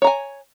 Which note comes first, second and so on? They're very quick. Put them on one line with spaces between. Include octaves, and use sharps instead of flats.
C#5 A#5 G#5